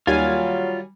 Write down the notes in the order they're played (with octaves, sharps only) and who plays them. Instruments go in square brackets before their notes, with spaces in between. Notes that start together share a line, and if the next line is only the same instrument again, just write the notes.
[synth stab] D#2 G#5 [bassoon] F#3 [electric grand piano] G3 [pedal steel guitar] F4 F5